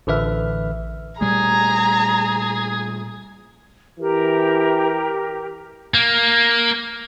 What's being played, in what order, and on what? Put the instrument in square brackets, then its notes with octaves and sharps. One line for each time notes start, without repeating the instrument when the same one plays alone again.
[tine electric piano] A1 D3 B4 E5 F6
[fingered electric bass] A#2 G3 A3 [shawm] G#4 [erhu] A#5
[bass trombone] E3 [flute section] G4 A#4
[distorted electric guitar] A#3